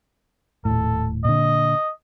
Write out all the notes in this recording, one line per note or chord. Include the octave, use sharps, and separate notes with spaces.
D#1 A2 A4
A#2 D3 D#5